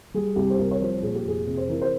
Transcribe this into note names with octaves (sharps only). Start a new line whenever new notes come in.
G3 G#4
C2 G4
C5
C2 A#4
C#5
F3 C5
A#2 G#4
G4
F1 G#4
C3
C5
E3 A#4
C5